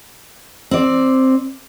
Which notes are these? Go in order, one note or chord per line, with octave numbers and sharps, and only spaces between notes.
C4 D5